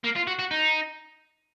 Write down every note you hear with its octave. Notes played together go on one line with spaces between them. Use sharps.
A#3
F4
F#4
F#4
D#4